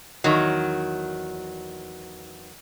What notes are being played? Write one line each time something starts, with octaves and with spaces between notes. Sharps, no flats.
E2 D#3 F#3